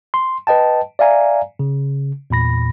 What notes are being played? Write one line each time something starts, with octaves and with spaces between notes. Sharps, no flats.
C6
B4 D#5 G5 A5
D5 E5 F5 G#5 A#5
C#3
E2 A#2 B5 A#6